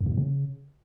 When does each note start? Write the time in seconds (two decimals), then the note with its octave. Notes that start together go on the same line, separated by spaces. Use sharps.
0.01 F2
0.06 B2
0.12 G#2
0.18 C#3